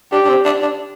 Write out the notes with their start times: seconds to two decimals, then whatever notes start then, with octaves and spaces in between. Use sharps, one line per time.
0.12 D4 G4
0.24 D4
0.29 C4
0.45 D4
0.62 D4